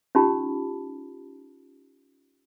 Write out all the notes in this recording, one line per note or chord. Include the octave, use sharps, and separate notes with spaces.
C#4 D#4 F4 G4 A5 B5